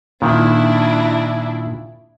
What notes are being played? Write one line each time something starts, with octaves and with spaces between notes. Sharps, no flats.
A#2 D#3 D4 E4